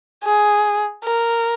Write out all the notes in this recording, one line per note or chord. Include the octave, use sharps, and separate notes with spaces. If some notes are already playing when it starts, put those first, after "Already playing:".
G#4
A#4